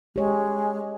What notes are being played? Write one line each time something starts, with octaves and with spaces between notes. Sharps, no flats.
G#3 G4 C#5